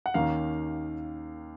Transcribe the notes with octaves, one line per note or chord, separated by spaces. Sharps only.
F#5
D#2 D#3 A#3 C#4 F5